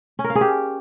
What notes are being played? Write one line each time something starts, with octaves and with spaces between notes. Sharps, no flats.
C#4
A#4
F5
G#4
G4